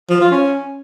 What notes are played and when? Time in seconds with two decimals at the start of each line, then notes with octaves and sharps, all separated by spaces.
0.10 F3
0.21 F4
0.32 C#4